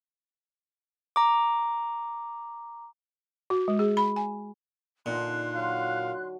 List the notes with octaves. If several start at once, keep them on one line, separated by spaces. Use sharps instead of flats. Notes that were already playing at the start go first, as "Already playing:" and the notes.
A#5 D6
F#4
G#3
G#4
B5
G#5
A#2 D3 D#4 C6 F#6
F#3 F5